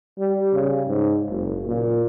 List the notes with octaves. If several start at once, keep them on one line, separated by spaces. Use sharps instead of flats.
G3
C#3
G#2
F#1
A#2